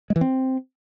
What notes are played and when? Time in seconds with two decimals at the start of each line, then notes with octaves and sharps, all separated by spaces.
0.10 G#3
0.16 E3
0.21 C4